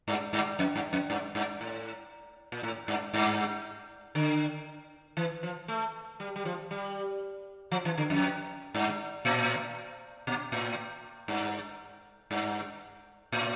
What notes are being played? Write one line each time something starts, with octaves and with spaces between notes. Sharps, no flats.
G2
G2
F2
G2
F2
G2
G2
A2
A#2
A2
G2
G2
D3
E3
F3
A3
G3
G3
F3
G3
F3
E3
D3
F2
G2
A2
A#2
A2
G2
G2
A2